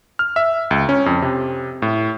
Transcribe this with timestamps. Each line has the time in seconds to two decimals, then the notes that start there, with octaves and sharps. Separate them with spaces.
0.19 F6
0.36 E5
0.71 C#2
0.89 C#4
1.06 F2
1.22 C3
1.82 A2